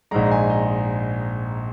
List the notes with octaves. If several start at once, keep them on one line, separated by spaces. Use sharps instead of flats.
A#1 G#2 G#3 A#5
G#5
D#5